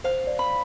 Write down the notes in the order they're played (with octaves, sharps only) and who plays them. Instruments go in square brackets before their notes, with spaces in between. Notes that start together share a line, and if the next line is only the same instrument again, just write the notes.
[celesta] C5 [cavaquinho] F5
[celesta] D5
[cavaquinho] B5